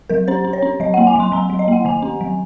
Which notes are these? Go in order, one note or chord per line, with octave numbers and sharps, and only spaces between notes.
F#3 A#4
C#4 C5
C#4
C#5
C#4
F#3 D#5
A#3 F#5
G#5
F#3 C6
F#3 A#5
F#3
D#5
A#3 F#5
D#3 G#5
C#4
F#3